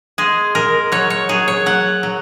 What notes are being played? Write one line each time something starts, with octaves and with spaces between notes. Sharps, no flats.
G#3 G#4
G#3 A#4
F#3 C#5
C#5
F#3 G#4
C#5
F#3 F#5
F#3